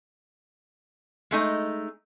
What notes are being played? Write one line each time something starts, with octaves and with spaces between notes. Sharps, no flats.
G#3 A3 D#4